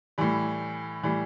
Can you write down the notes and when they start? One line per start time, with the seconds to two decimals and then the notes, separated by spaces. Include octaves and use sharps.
0.18 A2 E3 G3
1.03 A2 E3 G3